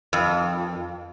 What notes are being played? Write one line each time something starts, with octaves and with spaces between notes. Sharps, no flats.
F2